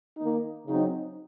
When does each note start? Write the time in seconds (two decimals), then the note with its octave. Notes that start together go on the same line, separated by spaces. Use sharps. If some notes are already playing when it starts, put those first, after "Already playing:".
0.17 D#3 A#3 D#4
0.66 C#3 F#3 C4 D#4